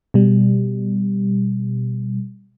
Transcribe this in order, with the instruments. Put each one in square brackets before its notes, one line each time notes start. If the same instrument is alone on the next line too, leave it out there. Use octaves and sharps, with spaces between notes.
[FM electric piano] B2 G3